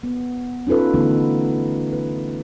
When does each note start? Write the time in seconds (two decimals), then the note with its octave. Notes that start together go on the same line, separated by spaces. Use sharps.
0.03 B3
0.67 C#4 D#4 F4 A4 B4
0.94 D3 E3 A3 B3 D#4
1.93 B4